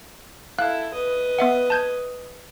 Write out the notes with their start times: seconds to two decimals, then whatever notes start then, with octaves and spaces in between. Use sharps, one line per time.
0.59 E4 A4 F5 F#6
0.94 B4 D#5
1.39 B3 E5 F#5
1.70 A5 G6 G#6